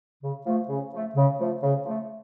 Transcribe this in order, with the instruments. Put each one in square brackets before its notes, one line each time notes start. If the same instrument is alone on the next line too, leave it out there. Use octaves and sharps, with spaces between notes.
[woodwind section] C#3
F3 A3
C#3
F3 A3
C#3
F3 A3
C#3
F3 A3